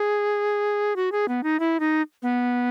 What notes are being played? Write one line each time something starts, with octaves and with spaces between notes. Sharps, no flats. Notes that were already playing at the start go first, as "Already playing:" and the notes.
Already playing: G#4
F#4
G#4
B3
D#4
E4
D#4
B3